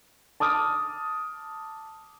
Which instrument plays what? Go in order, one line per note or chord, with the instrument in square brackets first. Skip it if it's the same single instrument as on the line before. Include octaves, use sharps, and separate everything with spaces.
[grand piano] A5 D6 D#6 F6